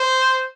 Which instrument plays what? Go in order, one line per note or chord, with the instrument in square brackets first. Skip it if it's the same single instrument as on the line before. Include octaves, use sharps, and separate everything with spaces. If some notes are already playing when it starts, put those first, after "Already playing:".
Already playing: [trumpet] C5